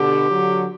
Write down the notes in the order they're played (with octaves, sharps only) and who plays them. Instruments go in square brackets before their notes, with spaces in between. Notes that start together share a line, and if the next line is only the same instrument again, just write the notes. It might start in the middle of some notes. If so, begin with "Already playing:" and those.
Already playing: [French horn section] B2 D3 [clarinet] G4
[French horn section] D3 F#3